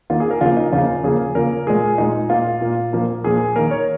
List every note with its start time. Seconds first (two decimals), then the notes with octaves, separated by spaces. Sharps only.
0.10 D#3 A#3 F4
0.20 G#4
0.31 A#4
0.41 C#3 F3 A#3 F4
0.57 D#4
0.72 C#3 F3 A#3 F4
1.04 C#3 F3 A#3 G#4
1.35 C#3 F3 A#3 A#4
1.67 A#2 G#3 G#4
1.98 A#2 G#3 D#4
2.30 A#2 A#3 F4
2.61 A#2 A#3
2.93 A#2 F3 A#3
3.24 A#2 F3 A#3 G#4
3.56 D#3 A#3 A#4
3.71 C#5